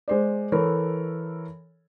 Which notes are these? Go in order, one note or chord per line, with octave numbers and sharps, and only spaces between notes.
G#3 C5 D5
E3 A4 A#4 C#5